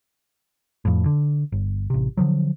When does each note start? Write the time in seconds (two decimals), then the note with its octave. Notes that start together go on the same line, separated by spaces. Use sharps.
0.85 F2 A2
1.06 D3
1.52 G1
1.90 A1 C3
2.17 D3 F3 F#3